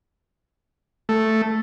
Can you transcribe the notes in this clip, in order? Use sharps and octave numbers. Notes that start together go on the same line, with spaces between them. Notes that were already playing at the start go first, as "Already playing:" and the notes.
A3